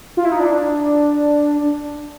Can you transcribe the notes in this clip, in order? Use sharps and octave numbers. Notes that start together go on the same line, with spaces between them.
F4
E4
D#4
D4